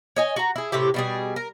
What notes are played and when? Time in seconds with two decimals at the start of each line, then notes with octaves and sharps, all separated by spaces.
0.16 C#5 D#5 G#5
0.36 F#4 A#5
0.56 E4 G#4
0.72 A2 C3 E4 G4
0.94 B2 G3 G#4
1.36 A#4